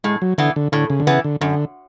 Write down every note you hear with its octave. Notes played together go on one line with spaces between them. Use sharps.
A2 G#3
F#3
D3 E3 B3
D3
A2 D3
C#3
D3
C#3 E3 B3
D3
F#2 D3